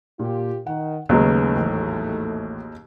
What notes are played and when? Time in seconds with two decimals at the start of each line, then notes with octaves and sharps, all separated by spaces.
0.19 A#2 F4 G4
0.67 D#3 F#5
1.09 D#2 G#2 C#3 F#3 G#3 A3 B3 B4
1.56 A1